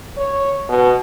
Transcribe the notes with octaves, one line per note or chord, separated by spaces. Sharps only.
C#5
B2